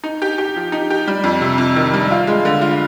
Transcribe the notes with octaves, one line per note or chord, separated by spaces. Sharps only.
D#4
G4
G4
F3
D#4
G4
G3
F2
C3
F2
D#3
G3
F4
G#3
D3
F4